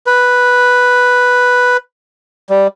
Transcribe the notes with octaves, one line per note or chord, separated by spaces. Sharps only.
B4
G3